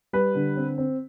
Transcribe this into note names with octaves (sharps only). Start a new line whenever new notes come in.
G3 B4
D3
C4
C4